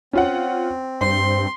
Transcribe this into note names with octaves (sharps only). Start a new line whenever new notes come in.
C4 C#4 F4 F#5
G2 C5 C6